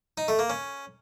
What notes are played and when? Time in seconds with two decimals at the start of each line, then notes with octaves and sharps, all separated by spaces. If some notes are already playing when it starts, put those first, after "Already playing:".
0.18 D#4
0.28 A3
0.39 A#3
0.50 C#4